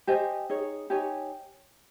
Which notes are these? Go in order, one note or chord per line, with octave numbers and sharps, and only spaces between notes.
G4 C5 D#5 G#5
D#4 G#4 C#5
D#4 G4 C#5 G#5